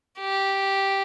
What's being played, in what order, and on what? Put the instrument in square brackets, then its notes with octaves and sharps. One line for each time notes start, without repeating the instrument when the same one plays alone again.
[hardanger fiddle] G4